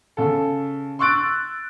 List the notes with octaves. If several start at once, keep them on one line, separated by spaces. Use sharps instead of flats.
C#3 A4
C6 C#6 E6 F#6 A6 D7